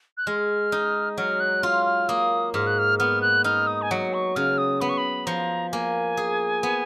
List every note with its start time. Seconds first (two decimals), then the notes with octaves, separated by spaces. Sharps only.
0.17 F#6
0.27 G#3 F6
0.72 D#4
1.18 F#3 F6
1.40 F#6
1.63 F4 F6
1.86 F6
2.09 A#3 D#6
2.54 G#2 F6
2.67 F#6
2.79 F6
2.99 B3 F6
3.22 F#6
3.44 D#4 F6
3.67 D#6
3.82 G#5
3.91 F#3 F#5
4.14 C#6
4.36 C#3 F6
4.58 D#6
4.81 B3 B5
4.89 C#6
4.98 B5
5.26 F3 A#5
5.72 A#3 G#5
6.17 G#4
6.63 B3